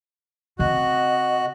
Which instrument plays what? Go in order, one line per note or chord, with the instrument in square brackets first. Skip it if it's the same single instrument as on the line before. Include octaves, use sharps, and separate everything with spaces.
[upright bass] C#3 C4 [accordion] F#4 F#6 [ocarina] D#5